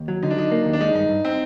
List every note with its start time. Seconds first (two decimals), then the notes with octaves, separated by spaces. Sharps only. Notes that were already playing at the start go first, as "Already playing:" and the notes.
Already playing: D#2
0.08 F#3
0.23 D3 D#4
0.30 D4
0.37 F#3 D#4
0.52 A#3
0.66 D#2
0.73 D4
0.80 G#3 D#4
0.94 G2 D#4
1.09 G2
1.25 C4